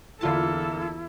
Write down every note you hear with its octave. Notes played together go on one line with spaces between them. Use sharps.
E2 D3 A#3 E4 F4 A4 A5